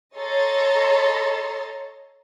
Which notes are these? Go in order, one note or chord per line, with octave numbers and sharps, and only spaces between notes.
A4 C#5 D#5 A#5 C6 A6